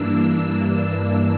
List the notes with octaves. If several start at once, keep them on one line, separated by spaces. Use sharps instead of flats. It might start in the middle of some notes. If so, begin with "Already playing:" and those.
Already playing: G2 E3 A#3 D4 E6